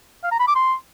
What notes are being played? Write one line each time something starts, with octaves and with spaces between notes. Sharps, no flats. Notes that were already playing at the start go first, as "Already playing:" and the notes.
F5
A#5
B5
D6
C6